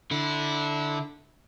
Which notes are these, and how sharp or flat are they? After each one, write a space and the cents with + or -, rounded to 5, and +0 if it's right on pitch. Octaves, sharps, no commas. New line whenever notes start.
D3 +0 E4 -20